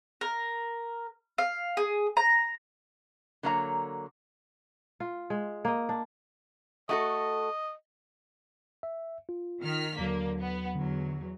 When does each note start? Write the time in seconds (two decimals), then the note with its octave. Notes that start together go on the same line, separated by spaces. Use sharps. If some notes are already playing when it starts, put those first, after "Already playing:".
0.21 A#4
1.38 F5
1.77 G#4
2.17 A#5
3.43 D3 F#3 A#3 C#5 D#5 A#5
5.00 F4
5.30 G#3
5.65 A#3 D#5
5.89 D4
6.89 A3 F#4 A4 D#5
8.83 E5
9.29 F4
9.64 D#3 F6 B6
9.98 D#2 D3 F#3 A#3
10.41 B3
10.75 E2 D3 F#3